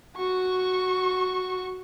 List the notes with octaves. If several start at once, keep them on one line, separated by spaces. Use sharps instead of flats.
F#4 C#6